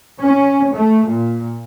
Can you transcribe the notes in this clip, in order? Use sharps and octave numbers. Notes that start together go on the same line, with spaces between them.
C#4
A3
A#2